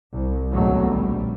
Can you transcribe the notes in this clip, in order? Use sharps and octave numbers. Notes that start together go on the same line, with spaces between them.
C2
G#1 D2 B2 D3 F#3 A3
A#1 G3